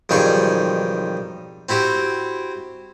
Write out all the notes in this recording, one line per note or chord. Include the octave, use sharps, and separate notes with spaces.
B1 F2 D#3 G3 G#4 C#6
C4 E4 F#4 G4